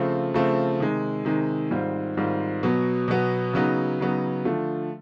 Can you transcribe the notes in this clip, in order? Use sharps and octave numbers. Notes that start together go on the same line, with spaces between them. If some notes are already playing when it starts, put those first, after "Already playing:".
Already playing: C#3 F3 A3 C4
C#3 F3 A3 C4
C3 D#3 G#3
C3 D#3 G#3
G#2 D#3 G3 C4 F4
G#2 D#3 G3 C4 F4
B2 F#3 B3
B2 F#3 B3
C#3 F#3 B3 D#4
C#3 F#3 B3 D#4
D3 F3 A3